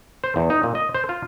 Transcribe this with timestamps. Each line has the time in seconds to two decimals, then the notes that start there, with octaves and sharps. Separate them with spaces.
0.24 C5
0.36 E2
0.50 D#4
0.63 A#2
0.75 D#5
0.95 C5
1.09 F4